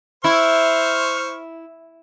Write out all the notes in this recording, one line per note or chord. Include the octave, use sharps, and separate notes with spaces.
E4 C5 C#6 F6